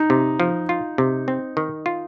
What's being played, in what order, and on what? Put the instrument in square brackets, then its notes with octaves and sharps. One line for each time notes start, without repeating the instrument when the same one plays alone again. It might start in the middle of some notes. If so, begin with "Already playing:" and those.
Already playing: [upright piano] D#4
[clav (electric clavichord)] C3
F3
F4
C3
C4
D#3
F4